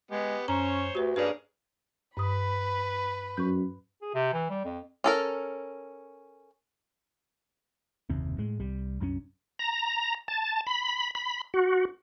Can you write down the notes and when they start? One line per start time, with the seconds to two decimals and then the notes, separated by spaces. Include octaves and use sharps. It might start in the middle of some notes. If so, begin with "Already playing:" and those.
0.11 G#3 B3 G4
0.48 F#2 C#4 C5 C#5 A#5
0.95 D2 F#4 G4 B4
1.16 G2 A#3 C#4 G#4 B4 D5
2.17 G2 B4 B5 D#6
3.37 F#2 C#6 G6
4.02 G#4
4.14 C3
4.33 E3
4.50 G3
4.65 F2
5.04 C#4 A4 A#4
8.10 F#1 D#2 C3
8.38 A2 G#3
8.59 C2 G3
9.00 C2 F#2 F3 C#4
9.59 A#5
10.28 A5
10.67 B5
11.15 B5
11.54 F#4